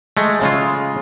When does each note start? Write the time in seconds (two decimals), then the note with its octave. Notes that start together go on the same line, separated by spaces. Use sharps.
0.17 G#3 A3
0.41 C#3 G#3 F4